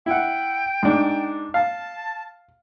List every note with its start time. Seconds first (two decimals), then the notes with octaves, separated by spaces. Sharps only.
0.06 E4 F#5 G5
0.83 G#2 D4
1.54 F5 A5